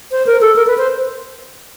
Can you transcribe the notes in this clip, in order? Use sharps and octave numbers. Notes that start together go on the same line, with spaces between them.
C5
A#4
A4
A#4
B4
C5